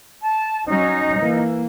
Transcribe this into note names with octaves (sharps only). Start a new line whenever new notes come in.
A5
F#3 C#4 D#4
E3 A#3